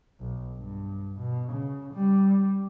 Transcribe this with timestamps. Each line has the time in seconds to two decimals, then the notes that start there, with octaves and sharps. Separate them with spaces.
0.19 B1
0.57 G2
1.18 B2
1.52 C#3
1.94 G3